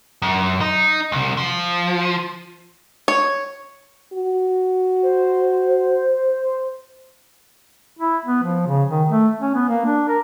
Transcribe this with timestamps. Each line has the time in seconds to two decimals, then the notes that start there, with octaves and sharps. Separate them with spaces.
0.22 F#2
0.61 D#4
1.12 C2
1.37 F3
3.08 C#5
4.13 F#4
5.03 C5
7.99 E4
8.26 B3
8.43 F3
8.67 C#3
8.90 D#3
9.09 A3
9.41 C#4
9.55 B3
9.69 A#3
9.85 D4
10.08 A#4